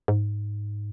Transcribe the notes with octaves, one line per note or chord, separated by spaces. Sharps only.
G#2